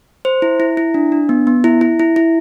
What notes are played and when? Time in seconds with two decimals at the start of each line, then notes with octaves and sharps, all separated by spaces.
0.25 C5
0.42 E4
0.60 E4
0.77 E4
0.94 D4
1.12 D4
1.29 B3
1.47 B3
1.64 E4
1.81 E4
1.99 E4
2.16 E4